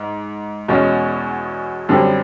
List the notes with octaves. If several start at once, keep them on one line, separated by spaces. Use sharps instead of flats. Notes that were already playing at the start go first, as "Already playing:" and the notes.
Already playing: G#2
E2 B2 G#3 C#4
F#2 D3 G3 C4